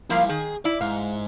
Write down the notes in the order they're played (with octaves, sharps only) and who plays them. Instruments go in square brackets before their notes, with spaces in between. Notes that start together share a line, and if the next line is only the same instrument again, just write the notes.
[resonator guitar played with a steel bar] F3 A#3 F5 [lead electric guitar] G3 E4
[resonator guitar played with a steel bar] D#3 [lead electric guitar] G#4
[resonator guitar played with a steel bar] E4 [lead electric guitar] D5
[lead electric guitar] G#2 [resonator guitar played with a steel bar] F5